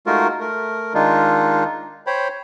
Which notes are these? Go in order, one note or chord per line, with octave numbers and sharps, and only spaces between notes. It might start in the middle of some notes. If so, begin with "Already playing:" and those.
G#3 A3 D#4 F4 F#4 A#4
A3 A#4
D#3 G#3 D4 D#4 F4
C5 C#5 G5 B5